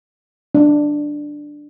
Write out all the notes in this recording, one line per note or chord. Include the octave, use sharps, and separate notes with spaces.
D4